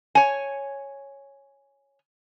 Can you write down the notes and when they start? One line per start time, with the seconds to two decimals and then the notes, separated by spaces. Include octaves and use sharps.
0.15 C#5 G#5